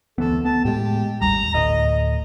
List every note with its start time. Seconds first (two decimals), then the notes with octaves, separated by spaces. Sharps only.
0.18 D2 E3 B3 A4
0.45 B3 A5
0.65 A2 G#3 G4
1.21 G#1 D#2 G3 A#5
1.54 D2 A2 D#5